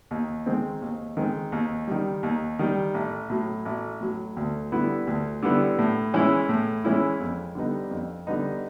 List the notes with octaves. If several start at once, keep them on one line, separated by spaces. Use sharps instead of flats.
D#2
D#3 G#3 C4
D#2
D#3 G#3 C4
D#2
D#3 G3
D#2
D#3 G3
A1
A2 F#3
A1
A2 F#3
D2
D3 G3 B3 E4
D2
D3 G3 B3 E4
A2
E3 G#3 C#4 E4
A2
E3 G#3 C#4 E4
F2
D3 G3 B3 D#4
F2
D3 G3 B3 D#4